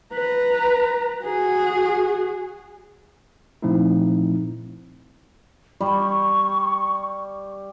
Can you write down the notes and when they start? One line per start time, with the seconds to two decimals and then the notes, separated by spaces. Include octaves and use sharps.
0.14 B4 A#5
1.24 F#4 G#4
3.62 A#2 F3 A3 C4 D#4 E4
5.81 G3 C#6